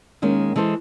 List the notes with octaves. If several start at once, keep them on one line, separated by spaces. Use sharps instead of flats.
D#2 D#3 G#3 C#4
E3 G#3 A4 C5